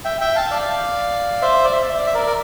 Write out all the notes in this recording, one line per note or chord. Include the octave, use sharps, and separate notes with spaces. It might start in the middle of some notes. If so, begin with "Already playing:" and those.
E5 G5
E5 G5
F5 A5
D5 F5
C5 E5
D5
E5
D5
E5
D5
E5
A#4 D5
A#4